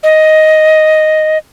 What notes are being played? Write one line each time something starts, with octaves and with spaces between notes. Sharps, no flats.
D#5